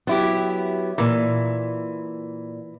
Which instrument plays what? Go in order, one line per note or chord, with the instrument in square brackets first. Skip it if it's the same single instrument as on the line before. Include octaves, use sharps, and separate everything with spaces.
[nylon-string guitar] F#3 [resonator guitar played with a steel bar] B3 E4 G4
[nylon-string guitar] A#2 A#4 [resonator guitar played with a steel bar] E3